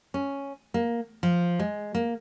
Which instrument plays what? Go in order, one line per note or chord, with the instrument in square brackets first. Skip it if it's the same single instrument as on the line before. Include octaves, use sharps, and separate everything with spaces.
[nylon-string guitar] C#4
A#3
F3
G#3
A#3